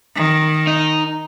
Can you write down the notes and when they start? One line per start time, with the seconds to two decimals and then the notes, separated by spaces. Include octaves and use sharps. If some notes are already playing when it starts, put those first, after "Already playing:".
0.16 D#3
0.67 D#4